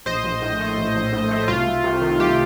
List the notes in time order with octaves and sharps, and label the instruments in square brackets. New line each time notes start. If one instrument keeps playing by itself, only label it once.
[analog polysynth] A#1 C5 D#5
A#1
A2
A3
A#1
A#1
A2
A3
C2 F4
C2
C3
D#3
C2 G4